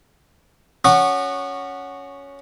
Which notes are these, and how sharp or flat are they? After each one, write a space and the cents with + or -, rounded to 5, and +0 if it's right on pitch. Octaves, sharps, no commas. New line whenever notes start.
C#4 +5 F#4 +0 D#6 -40